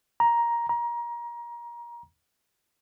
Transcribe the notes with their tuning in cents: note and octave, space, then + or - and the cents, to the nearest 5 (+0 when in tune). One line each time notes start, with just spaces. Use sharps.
A#5 +10
A#5 +25